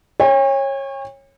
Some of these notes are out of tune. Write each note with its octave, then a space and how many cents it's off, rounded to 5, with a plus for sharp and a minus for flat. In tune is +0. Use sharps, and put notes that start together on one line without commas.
C#5 -20 G5 +45